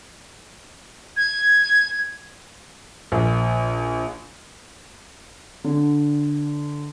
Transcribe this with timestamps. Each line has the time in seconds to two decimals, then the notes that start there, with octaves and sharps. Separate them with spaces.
1.17 G#6
3.12 A#1
5.64 D3